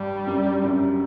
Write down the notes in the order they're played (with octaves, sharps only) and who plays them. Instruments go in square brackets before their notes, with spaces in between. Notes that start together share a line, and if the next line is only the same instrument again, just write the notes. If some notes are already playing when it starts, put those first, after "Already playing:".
Already playing: [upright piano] G2 [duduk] G3
[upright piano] F#2
F#2